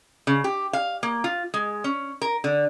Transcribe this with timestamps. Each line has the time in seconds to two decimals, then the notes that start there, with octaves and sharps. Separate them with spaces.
0.27 C#3
0.44 G4
0.73 F5
1.03 A#3
1.24 F4
1.54 G#3
1.84 C#4
2.21 A#4
2.44 D3